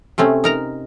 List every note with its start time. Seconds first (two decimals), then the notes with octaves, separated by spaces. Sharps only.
0.18 C3 A3 C4 C#4
0.44 D#4 A#4 A#5